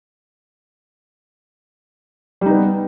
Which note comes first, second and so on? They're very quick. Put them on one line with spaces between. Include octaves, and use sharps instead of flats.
G3 D#4 B3